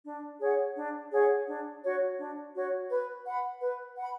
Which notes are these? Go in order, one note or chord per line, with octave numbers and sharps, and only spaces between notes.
D4
G#4 C#5 F#5
D4
G#4 C#5 F#5
D4
F#4 C#5
D4
F#4 C#5
B4
F#5 B5
B4
F#5 B5